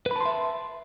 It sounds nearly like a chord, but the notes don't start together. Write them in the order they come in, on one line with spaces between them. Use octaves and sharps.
B4 B5 A5 C6 E5